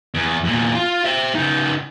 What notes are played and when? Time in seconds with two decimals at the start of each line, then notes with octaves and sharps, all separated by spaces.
0.14 E2
0.44 E2 A#2
0.75 F4
1.04 C5 E5
1.35 C#3 D#4